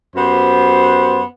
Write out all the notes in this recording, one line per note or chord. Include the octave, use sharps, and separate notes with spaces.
F#2 B3 G4 C5